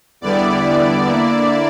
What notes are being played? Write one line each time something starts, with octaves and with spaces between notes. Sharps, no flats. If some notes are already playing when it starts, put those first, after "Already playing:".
E2 D3 G3 B3 E4 D5
D3 A#3 E4